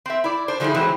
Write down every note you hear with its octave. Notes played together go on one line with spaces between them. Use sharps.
C4 E5
E4 D5
D4 C5
D3 F3 G3 D#4 E4 G#4
D3 E3 F#3 G#3 C4